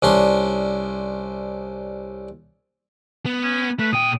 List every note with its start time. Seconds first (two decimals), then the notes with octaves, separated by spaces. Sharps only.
0.02 C2 C#4 D4 C6
3.26 B3
3.43 C#4
3.79 A3 B4
3.93 A#2 G5 D#6